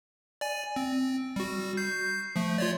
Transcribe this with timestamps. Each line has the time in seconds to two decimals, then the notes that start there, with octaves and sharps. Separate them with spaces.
0.41 D5 G#5
0.76 C4
1.36 G3 F#4
1.77 G6 C7
2.36 F3 A3
2.58 F4 C#5 D5